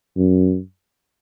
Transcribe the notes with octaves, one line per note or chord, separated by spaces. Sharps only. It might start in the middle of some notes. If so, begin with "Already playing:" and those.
F#2